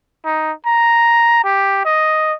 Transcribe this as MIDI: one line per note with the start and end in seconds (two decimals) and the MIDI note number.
0.25 0.52 63
0.66 1.43 82
1.44 1.84 67
1.85 2.34 75